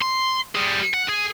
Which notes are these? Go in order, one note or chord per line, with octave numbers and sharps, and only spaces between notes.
C6
G3 G#4
F#5
G#4